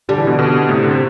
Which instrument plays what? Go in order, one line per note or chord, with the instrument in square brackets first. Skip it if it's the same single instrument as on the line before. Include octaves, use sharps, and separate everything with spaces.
[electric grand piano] D3 [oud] G3
[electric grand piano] E3
B2 D3
B2 D3
A2 C3
D3
C3